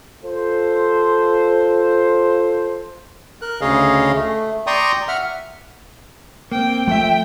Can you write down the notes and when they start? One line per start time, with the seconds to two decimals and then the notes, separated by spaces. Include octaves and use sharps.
0.24 F4 A4 C5
3.42 A#4 F#6
3.61 D2 C#3 G#4 C#5 D#5 F5
4.15 A3
4.67 D5 G5 A#5 C6 C#6 D#6
5.08 E5 F#5 F6
6.52 A#3 C4 G5
6.88 F3 A3 E5 G5